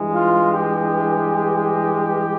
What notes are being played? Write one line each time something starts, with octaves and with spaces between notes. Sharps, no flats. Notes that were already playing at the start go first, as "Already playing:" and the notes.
Already playing: G2 E3 G#3
F4
G4